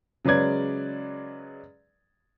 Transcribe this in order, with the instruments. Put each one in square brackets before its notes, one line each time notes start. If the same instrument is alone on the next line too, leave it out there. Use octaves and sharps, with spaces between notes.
[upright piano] C#3 F#3 G#3 B4 D5 G#6